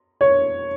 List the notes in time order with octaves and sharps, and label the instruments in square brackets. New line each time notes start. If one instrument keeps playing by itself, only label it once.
[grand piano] C#5